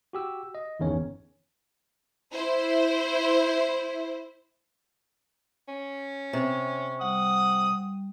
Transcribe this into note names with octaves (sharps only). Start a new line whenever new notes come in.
F#4 G4 E6
D#5
G1 E2 D#3 C#4 C#5
E4 C5
C#4
C3 C#6
G3 F#5 D#6